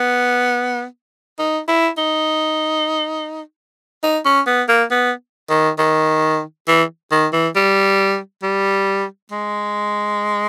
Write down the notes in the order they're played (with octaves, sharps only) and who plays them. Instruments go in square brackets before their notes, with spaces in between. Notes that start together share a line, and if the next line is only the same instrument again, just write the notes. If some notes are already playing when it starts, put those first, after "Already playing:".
Already playing: [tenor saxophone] B3
D#4
E4
D#4
D#4
C#4
B3
A#3
B3
D#3
D#3
E3
D#3
E3
G3
G3
G#3